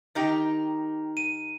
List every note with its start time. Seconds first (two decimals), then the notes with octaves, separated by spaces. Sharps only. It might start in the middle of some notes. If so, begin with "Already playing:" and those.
0.15 D#3 D#4 G4
1.17 D#7